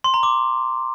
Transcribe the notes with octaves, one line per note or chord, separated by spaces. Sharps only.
C6
A#5
D6